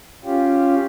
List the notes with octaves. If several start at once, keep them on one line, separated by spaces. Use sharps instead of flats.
C#4 F4 G4